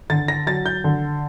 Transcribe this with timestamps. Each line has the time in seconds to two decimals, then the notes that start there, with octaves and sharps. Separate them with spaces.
0.10 D3 A6
0.28 A#6
0.47 F#3 A6
0.66 G6
0.84 D3